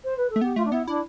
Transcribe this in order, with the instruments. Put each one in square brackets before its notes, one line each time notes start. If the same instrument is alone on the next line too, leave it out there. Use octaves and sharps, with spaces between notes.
[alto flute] C5
B4
A4
[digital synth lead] A3
[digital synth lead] B3 [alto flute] G4
[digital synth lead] A3 [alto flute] F4
[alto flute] D4
[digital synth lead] B3 [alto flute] E4
[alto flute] D4 [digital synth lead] E4